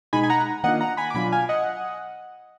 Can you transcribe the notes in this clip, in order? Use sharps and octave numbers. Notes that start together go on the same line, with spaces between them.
B2 G#3 D#4 G#5 B5
G#5
F#5 A#5
D#3 A#3 D4 F4 D#5 F#5
F#5 A#5
G#5 B5
D6
B2 F#3 D4 F4 G#5 B5
F5 G#5
D#5 F#5